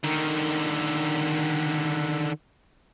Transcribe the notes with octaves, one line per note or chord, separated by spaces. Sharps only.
D3 D#3